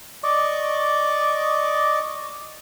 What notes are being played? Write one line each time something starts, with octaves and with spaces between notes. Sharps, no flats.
D5 D#5 C#6 D6